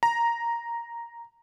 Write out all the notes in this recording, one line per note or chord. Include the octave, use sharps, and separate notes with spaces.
A#5